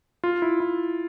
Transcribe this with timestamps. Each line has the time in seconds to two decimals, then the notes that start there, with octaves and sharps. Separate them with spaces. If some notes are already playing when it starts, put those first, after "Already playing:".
0.24 F4
0.42 E4
0.60 E4